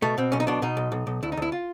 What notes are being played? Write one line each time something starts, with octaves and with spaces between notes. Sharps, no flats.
B2 A3
B2 C4
B1 C#4
D#4
B2 D4
B2 D#4
B1
B1
B1
D2 E4
D#4
D2 E4
F4